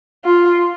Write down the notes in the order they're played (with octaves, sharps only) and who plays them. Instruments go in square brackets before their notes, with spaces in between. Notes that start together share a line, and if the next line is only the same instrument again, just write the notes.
[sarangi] F4